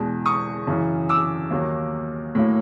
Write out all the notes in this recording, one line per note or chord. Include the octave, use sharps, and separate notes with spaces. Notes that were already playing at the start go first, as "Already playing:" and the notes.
Already playing: E2 B2 G#3
C#6 D#6
F#2 C#3 E3
D6 E6
D#2 D#3 F#3 A#3
A2 F#3 A#3